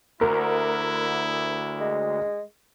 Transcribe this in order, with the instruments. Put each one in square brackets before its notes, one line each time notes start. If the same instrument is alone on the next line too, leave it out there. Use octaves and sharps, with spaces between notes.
[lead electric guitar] D2 [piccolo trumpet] E4 [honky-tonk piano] A#4
[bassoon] G#3